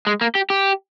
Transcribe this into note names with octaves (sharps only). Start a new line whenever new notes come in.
G#3
A#3
G4
G4